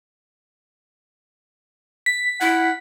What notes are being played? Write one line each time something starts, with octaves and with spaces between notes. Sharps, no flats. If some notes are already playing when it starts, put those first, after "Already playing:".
B6
E4 F#5